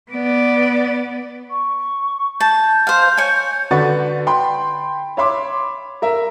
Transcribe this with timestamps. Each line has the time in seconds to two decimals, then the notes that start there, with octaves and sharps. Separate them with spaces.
0.11 B3 D5
1.51 C#6
2.40 A5 G6
2.87 C5 F5
3.17 C#5 G#5
3.71 D3 D4 F#4 B4 C#6 A6
4.27 G5 B5 C6
5.17 C#5 E5 B5 C6 D6
6.02 A#4 E5